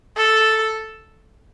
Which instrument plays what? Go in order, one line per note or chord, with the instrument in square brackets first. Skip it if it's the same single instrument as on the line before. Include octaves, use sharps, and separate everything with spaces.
[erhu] A4